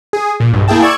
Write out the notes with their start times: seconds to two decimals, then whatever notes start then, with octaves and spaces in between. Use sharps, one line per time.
0.13 G#4
0.40 A#2
0.53 B1 G2
0.68 A#3 E4 G#4 G5 A5
0.82 D5 C#6 E6 G#6 C#7